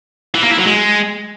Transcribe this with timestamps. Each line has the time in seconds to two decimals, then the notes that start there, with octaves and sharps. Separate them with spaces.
0.34 E3
0.42 A#3
0.50 E4
0.58 F#3
0.66 G#3